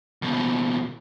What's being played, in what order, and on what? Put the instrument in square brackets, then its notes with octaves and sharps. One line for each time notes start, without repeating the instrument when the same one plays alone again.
[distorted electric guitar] D#2 B2